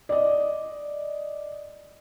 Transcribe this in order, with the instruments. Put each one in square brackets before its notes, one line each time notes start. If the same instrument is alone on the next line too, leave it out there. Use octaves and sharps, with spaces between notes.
[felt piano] D5 D#5